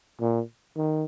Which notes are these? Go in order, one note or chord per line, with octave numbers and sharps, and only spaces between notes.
A#2
D#3